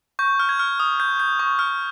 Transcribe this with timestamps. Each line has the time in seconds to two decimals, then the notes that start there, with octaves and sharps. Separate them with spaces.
0.19 C#6 G6
0.39 F6
0.49 G#6
0.59 F6
0.80 D#6
1.00 G6
1.20 G6
1.39 C#6
1.59 F6